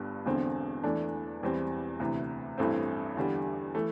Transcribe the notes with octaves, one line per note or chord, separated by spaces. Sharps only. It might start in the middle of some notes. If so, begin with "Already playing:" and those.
Already playing: G1 G2 G3 D4
E1 E2 D3 C4
E2 E3 A3 D4
E1 E2 E3 G3 C4
D2 C3 E3
A1 G2 E3 A3 C4
E2 D3 G3
E3 A3